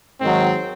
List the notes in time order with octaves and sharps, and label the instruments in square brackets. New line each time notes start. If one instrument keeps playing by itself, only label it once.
[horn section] G#2 D#3 F#3 C4